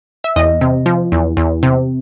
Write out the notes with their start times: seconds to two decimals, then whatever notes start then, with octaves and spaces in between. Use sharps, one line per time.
0.24 E5
0.36 E2 D#5
0.61 C3
0.86 F3
1.12 E2
1.37 E2
1.63 C3